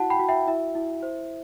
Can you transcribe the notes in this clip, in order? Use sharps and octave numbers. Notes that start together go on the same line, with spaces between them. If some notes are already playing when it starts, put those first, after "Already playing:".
Already playing: E4 F#4 F#5 A5
G5 B5
F#4
E5 G5
E4 E5
E4
C5